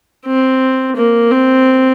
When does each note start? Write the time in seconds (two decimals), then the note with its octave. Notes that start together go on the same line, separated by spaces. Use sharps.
0.26 C4
0.96 A#3
1.31 C4